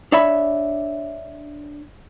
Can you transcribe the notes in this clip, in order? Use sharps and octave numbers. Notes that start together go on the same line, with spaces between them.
D4 C#5 E5 B5